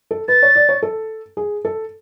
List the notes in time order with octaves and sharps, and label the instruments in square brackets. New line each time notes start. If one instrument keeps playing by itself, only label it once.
[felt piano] A4
[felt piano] B4 [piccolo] A6
[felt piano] C#5
D5
C#5
A4
G#4
A4